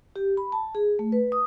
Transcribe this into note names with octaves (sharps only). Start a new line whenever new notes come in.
G4
B5
A5
G#4
A3
B4
D#6